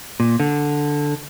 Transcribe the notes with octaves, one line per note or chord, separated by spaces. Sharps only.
A#2
D3